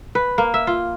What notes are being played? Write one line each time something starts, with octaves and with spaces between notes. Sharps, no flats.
B4
A#3
E5
F4